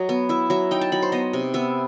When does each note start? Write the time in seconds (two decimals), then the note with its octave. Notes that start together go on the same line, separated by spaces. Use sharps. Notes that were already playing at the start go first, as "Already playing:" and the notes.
Already playing: F#3 D#5
0.09 B3
0.29 E4 E5
0.50 F#3 E5
0.71 D#4 G5
0.81 A5
0.92 F#3 B5
1.02 C5
1.12 B3 D#5
1.33 C3
1.54 B3 E5